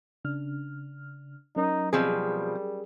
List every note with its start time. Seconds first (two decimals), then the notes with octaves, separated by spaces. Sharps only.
0.25 C#3 D4 F6
1.56 F#3 C#4 D#4 A#4
1.93 B2 F3 G3 C4 G#4